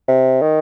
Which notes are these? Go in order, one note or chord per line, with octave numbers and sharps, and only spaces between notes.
C3
D#3